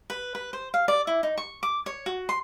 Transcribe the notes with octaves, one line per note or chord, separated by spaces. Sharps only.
B4
B4
C5
F5
D5
E4
D#4
C#6
D6
C#5
F#4
C6